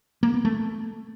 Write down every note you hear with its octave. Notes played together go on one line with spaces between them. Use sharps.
A#3
B3
A3